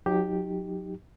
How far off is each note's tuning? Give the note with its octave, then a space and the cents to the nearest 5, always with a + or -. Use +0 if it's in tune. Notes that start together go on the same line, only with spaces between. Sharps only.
F#3 -30 D#4 +0 G4 +0